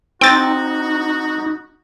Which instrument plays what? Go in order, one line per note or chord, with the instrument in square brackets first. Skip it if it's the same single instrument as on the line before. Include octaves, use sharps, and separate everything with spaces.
[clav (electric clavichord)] C4 [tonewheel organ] D#4 [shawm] F#4 [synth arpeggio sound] G5 A6